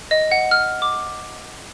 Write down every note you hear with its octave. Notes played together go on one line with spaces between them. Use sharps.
D#5
F#5
F6
D6